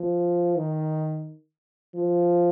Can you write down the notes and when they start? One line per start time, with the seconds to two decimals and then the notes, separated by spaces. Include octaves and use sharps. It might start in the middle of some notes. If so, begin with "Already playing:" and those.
Already playing: F3
0.56 D#3
1.95 F3